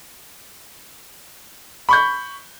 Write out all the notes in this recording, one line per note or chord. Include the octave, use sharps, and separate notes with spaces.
B5 C#6 G6